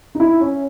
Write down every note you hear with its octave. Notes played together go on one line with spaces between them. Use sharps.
D#4
E4
C#4